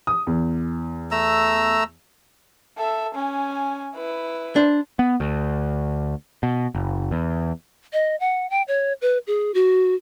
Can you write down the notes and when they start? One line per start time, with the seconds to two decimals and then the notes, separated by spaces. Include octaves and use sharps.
0.07 D#6
0.27 E2
1.11 A3 A#5 E6
2.78 A4 E5
3.15 C#4 G#5
3.95 E4 B4
4.56 D4 C5
4.99 B3
5.20 D2
6.43 B2
6.75 F#1
7.11 E2
7.93 D#5
8.20 F#5
8.50 G5
8.68 C#5
9.02 B4
9.27 G#4
9.54 F#4